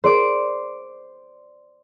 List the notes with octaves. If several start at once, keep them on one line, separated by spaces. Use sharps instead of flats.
G#4 A#4 C5 D5 D6